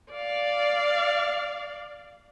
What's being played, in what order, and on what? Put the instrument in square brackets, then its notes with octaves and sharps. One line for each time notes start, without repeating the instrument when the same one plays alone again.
[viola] D5 F5